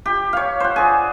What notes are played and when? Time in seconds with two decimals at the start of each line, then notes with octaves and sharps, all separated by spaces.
0.06 G4
0.33 C#5 F5
0.60 C5 F#5
0.76 G#4 D5